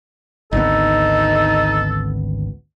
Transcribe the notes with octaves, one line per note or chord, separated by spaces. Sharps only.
G#1 D2 B3 D#4 A4